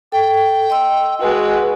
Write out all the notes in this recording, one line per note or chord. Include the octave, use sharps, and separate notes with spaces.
A4 G5
D#5 C6 E6
G#3 F#4 B4